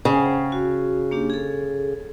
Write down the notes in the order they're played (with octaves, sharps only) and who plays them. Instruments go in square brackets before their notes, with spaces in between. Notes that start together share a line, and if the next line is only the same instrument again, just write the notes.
[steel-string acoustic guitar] C#3 [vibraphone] C5 F#5 G5
[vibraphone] F#4
A#3 D4 G4
G#4 A4